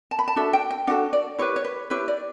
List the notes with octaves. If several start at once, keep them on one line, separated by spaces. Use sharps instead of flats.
A5
B5
A5
D4 F#4 A4 E5
G5
G5
D4 F#4 A4 F#5
D5
E4 G4 B4 C#5
C#5
B4
E4 G4 B4 C#5
D5